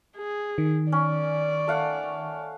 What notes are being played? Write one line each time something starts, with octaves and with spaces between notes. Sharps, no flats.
G#4
D#3
C#4 D5
A3 F5 F#5